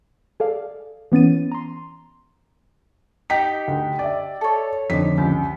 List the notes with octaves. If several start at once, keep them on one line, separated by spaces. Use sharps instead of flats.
G#4 A4 D5 F5
E3 B3 C#4 A6 D#7
A#5 C6
D#4 G4 B6
D2
D5 E5
A4 C#5
F2 D3 D#4 B6
C#2 G4